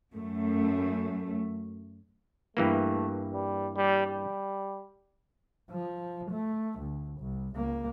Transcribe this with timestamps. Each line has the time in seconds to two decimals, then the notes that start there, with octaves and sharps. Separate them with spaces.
0.14 F#2 A3
2.57 G2 E3 A3 A#3
3.33 G3
3.76 G3
4.06 G3
5.71 F3
6.31 A3
6.79 D2
7.20 C2
7.56 C#2 A#3